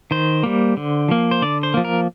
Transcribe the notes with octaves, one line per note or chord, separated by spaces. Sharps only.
D#3 C5
G3 A#3
D3
F3 A#3
C5
D3 D5
C5
F3 A#3
A#4